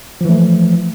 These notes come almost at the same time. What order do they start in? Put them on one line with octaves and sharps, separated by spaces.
F3 E3 A3